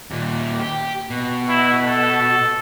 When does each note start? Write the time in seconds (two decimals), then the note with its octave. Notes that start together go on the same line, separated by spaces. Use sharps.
0.11 D#2 A#2
0.59 G4
1.10 B2
1.49 E4
1.86 A4